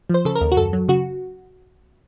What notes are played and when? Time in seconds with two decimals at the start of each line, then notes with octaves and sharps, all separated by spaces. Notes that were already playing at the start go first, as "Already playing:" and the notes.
0.09 F3 C5
0.25 C#3 A4
0.35 A#4
0.41 D#2
0.52 F#4
0.57 F#2 A4
0.73 F#3
0.88 C#3 F#4